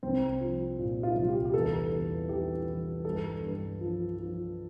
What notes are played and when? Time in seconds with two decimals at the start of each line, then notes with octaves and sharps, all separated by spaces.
0.03 C2 C4
0.41 F3
0.79 A#2
1.03 F4
1.16 C2
1.29 G4
1.45 G4
1.54 E2 A4
1.92 E2
2.29 E3 G4
2.67 E3
3.05 G2 A4
3.43 G2
3.81 F3
4.19 F3